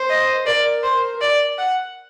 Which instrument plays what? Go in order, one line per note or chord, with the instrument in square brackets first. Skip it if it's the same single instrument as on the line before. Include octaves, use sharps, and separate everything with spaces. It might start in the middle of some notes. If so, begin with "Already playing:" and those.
Already playing: [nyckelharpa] C5
[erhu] D#5
[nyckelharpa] A#4 [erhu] D5
[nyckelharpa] A#4 [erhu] C5
[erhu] D5
F#5